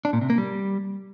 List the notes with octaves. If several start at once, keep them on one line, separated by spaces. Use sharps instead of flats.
D4
A#2
C3
A#3
G3